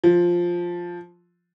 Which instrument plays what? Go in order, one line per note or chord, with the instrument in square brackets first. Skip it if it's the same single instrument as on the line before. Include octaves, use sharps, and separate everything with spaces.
[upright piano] F3